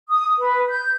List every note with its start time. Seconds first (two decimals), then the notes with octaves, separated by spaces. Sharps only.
0.09 D#6
0.39 B4
0.69 G6